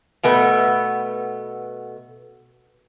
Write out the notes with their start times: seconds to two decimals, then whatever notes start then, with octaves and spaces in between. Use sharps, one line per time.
0.23 B2 A3 B3